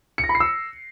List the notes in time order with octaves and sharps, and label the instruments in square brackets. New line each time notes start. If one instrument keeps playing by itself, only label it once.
[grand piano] C#7
A#6
B5
C7
E6